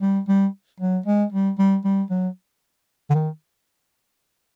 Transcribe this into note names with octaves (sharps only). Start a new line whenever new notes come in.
G3
G3
F#3
G#3
G3
G3
G3
F#3
D3
D#3